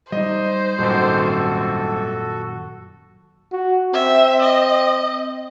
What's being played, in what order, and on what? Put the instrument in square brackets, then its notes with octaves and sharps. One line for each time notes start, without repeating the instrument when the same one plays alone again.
[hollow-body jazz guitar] G3 D#4 [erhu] C5 [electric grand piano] D#5
[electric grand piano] G#1 G3 [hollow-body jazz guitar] F#2 A#2 D#3 [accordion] F#4 A4
[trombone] F#4
[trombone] C4 [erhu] E5
[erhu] D#5